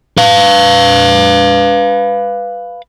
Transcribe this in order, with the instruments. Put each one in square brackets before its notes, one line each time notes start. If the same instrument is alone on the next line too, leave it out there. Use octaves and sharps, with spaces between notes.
[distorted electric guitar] B4 F5